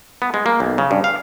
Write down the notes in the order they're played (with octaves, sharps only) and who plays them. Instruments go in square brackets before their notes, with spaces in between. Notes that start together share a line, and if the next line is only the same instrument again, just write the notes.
[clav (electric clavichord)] B3
G#3
A#3
B1
C#3
G2
F5